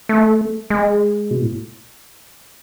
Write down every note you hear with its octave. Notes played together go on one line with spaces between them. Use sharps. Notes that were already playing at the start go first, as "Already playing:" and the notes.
A3
G#3
B2
A2